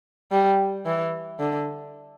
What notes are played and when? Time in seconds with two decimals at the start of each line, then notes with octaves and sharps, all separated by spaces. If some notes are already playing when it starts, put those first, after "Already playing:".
0.31 G3
0.86 E3
1.40 D3